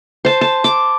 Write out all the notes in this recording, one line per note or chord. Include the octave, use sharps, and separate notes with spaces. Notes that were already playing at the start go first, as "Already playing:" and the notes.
C5 A5
A5
D6